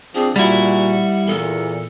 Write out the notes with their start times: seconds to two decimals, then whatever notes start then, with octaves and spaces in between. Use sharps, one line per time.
0.15 F3 C4 D4 G#4
0.36 A#2 G3 E4 F#4 F#5
1.27 E2 A#2 A4